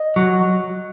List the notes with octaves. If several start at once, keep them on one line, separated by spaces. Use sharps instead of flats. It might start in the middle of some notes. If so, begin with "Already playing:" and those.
Already playing: D#5
F#3